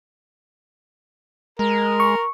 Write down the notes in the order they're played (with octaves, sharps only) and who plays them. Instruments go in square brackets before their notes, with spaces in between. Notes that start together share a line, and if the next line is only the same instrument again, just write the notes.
[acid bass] G#3 [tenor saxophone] A#4
[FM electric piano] C#6